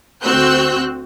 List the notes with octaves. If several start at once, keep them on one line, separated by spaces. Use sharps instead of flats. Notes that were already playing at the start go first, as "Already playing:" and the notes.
D2 C4 F#4 E6 F#6 G6